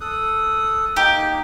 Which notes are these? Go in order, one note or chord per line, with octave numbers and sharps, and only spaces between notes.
A4 D#6 F#6
A#3 D#4 G4